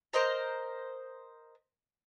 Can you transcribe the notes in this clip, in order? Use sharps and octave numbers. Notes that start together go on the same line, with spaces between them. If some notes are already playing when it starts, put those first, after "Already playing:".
A#4 C5 D#5 A#5